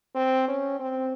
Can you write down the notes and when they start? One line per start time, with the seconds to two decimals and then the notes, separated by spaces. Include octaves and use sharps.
0.15 C4
0.48 C#4
0.80 C4